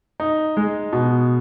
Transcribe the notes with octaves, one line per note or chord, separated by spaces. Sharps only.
D#4
G#3
B2